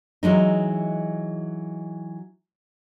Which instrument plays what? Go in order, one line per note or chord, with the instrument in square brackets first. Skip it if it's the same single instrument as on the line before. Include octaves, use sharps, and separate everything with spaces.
[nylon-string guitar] E3 F#3 G#3 D#4